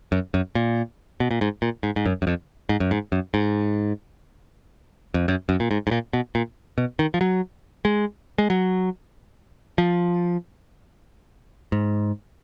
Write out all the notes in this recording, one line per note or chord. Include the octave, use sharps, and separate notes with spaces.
F#2
F#2
A#2
B2
A#2
G#2
A#2
G#2
G#2
F#2
F#2
F2
G#2
F#2
G#2
F#2
G#2
F2
F#2
F#2
A#2
G#2
G#2
A#2
B2
A#2
B2
D#3
F3
F#3
G#3
G#3
F#3
F3
G#2